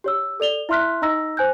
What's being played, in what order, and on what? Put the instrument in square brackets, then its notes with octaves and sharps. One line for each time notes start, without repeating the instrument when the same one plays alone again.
[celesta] G4 C#5 E6
A4 D5 F7 G7
E4 E5 C6 F6 F#6 B6
D#4 D#5 A#5 E6 A#6
C5 G#5 F#6 G6